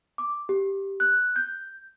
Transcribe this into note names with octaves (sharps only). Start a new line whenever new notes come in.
D6
G4
F#6
G6